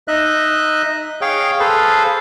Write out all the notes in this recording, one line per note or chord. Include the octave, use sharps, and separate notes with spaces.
D#4 D#5 E5 F#6
G#4 C#5 F5 G5
G#4 A4 B4 C5 F5